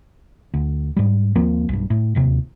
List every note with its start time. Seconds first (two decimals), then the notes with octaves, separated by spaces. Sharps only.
0.54 D2
0.97 G#2 G3
1.35 D#2 F3 A#3 C4
1.69 B1 G2
1.90 A2
2.15 D1 D#2 C3